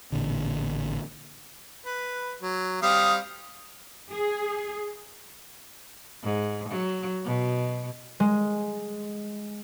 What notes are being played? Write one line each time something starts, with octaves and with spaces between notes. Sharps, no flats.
A1 A#2 D3
B4
F#3
G3 C4 F5 D#6
G#4
G#2
F#3
B2
G#3